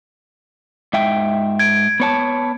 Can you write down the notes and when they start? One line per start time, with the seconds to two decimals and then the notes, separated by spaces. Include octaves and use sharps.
0.93 G#2 E5 G5
1.59 G#6 D7
2.00 B3 C#5 A5